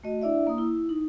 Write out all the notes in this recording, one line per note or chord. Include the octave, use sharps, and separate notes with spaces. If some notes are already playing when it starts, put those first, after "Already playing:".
A3 F#4 D#5
D4 E4 D5 E5
A#3 D#6
E4
D#4